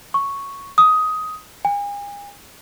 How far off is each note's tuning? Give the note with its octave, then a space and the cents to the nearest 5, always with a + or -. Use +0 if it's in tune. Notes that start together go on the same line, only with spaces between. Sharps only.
C#6 +0
D#6 +15
G#5 -40